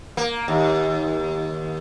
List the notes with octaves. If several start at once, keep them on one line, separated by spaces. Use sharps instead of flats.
A#3
D#2